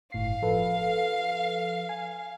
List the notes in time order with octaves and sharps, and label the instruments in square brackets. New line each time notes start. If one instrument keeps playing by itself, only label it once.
[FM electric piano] G1 A2 C7 [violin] F5
[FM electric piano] F3 A4 B4
G#5